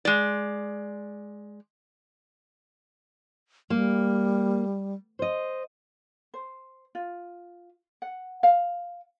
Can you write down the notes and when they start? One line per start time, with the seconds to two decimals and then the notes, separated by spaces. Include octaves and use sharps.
0.05 G#3 D5
3.70 G3 A#3
5.19 C5 D#5
6.34 C5
6.95 F4
8.02 F#5
8.43 F5